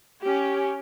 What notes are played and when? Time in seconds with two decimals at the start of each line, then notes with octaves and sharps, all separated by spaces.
0.23 C#4 G4